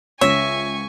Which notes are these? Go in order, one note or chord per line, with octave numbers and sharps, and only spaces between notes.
C#2 C#3 C#5 E5 G#5 C#6 A#6